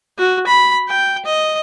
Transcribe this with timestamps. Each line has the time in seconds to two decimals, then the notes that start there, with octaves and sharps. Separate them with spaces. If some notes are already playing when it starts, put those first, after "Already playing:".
0.18 F#4
0.47 B5
0.88 G5
1.25 D#5